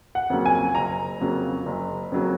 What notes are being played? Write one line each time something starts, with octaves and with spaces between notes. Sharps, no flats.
F#5
F2 C#3 F#3 A#3
G#5
F#1 A#5
F2 C#3 F#3 A#3
F#1
F2 C#3 F#3 A#3